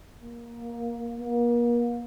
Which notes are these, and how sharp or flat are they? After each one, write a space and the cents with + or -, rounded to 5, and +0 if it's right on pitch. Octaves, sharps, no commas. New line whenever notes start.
A#3 +15
A#3 +35